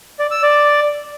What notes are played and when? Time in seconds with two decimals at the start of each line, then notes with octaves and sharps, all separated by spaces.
0.19 D5
0.31 E6
0.43 D5